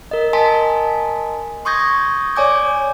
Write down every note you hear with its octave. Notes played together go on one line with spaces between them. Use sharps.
A#4 D#5
A#4 D#5 G#5 A5 C6 B6
C6 C#6 D#6 G6 G#6 A#6
C#5 D5 G#5 D6 G6